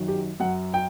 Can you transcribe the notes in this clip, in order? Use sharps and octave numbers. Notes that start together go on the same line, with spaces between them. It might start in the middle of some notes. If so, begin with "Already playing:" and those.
Already playing: F#2 D#3 F#3
G4
F#2 F#3 F#5
G5